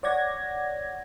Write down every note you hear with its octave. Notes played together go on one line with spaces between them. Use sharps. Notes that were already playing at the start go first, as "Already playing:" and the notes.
C#5 D5 F#5 G#6 A#6